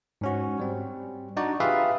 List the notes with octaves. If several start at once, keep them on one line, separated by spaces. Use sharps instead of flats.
G#2 C#4 F#4
G3 C4
D4 D#4 F#4 D5
F4 G4 G#4 B4 E5 F5